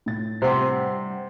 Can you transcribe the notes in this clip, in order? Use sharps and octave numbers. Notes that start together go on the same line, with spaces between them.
A2 A6
G2 C3 G4 C5 F#5 G5 C6